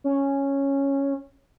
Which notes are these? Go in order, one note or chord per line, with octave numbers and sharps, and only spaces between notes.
C#4